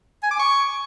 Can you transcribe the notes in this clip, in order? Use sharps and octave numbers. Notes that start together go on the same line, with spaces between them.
G#5
D6
C#6